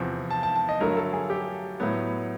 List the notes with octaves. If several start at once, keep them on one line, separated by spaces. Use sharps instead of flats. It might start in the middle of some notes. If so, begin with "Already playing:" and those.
Already playing: E2 C3 F3
A5
A5
A5
D#5
G2 D3 F#3 A3 A#4
A4
G#4
G4
A2 F#3 B3